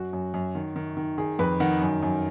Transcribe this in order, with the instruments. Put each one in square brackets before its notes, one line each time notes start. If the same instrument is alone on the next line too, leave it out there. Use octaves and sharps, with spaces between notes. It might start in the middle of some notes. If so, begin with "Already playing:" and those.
Already playing: [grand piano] F#2 F#4
F#2
F#2
D#3
D#3
D#3
D#3 G#4
F2 B4
D#3 F#5
F#2
F#2